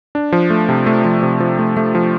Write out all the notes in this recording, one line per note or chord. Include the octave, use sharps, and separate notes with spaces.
D4
F3
A3
C3
A3
F3
C3
F3
A3
A3
F3